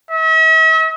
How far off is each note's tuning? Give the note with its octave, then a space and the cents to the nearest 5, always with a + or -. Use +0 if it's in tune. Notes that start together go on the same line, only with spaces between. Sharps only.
E5 -45